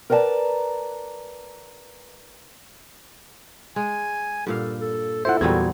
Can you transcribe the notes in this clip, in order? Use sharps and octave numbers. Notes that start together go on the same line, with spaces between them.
A#4 B4 D5 F#5 A5 A#5
G#3 G#5
G2 A#2 A4 F5
A4
E4 F4 A4 C5 E5 F#5
E2 A#2 F#3 G3 C4 F#4 G#6